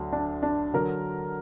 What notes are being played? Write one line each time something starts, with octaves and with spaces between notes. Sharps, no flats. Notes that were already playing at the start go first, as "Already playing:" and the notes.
Already playing: D2 D3 F#3
D4
D4
D3 F#3 A#4